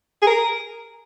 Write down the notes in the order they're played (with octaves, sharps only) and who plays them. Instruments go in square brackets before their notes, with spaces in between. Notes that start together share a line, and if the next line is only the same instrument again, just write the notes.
[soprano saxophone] G#4
A#4